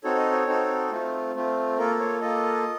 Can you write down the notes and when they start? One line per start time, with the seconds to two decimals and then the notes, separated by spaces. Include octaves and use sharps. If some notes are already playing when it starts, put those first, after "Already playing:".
0.04 C4 D#4 F#4 A4 C#5
0.17 D#5
0.31 C#5
0.47 C4 D#4 F#4 A4
0.91 A3 C4 F4
1.34 A3 C4 F4
1.78 A#3 F4 A4 A#4
1.99 C#5
2.21 A#3 F4 A4 D#5